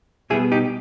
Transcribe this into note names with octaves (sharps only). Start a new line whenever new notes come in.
B2 G3 B3 E4 G#4
D#4 G4